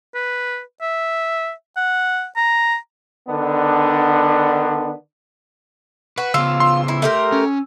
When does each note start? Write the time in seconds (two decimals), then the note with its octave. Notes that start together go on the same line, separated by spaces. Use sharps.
0.15 B4
0.82 E5
1.77 F#5
2.37 A#5
3.28 D3 D#3 B3 D4
6.18 F#4 B4
6.34 C#3 B3 F4 E6
6.60 C6
6.88 E4
7.02 A3 G4 A#4
7.32 C#4